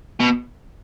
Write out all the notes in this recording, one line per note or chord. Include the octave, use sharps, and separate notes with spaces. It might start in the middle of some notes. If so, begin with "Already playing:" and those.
B2